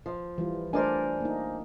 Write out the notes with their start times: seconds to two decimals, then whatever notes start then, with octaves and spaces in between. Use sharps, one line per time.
0.06 F3
0.38 E3 G3 F4
0.73 A3 D4 A#4 C5 D5 G#5
1.21 A#3 D#4